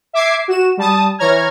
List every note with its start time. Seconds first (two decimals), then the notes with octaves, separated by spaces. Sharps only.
0.13 E5 D6 G#6 C7
0.48 F#4 E7
0.77 G3 A5 D#6
1.18 E3 C#5 A#5 F6 G#6